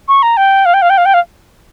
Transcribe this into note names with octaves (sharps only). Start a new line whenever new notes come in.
C#6
A#5
G5
F5
G5
F5
G5
F5
G5
F5